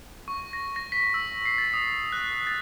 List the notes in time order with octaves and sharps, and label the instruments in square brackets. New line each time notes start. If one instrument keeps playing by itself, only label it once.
[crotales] C#6
A#6
A#6
B6
E6
C7
A6
D#6
F#6
A6